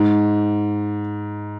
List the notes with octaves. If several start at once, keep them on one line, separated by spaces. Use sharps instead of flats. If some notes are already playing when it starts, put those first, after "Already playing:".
Already playing: G#2